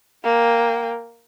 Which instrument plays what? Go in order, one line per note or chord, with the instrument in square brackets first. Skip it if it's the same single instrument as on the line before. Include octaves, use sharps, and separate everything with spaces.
[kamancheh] A#3 G5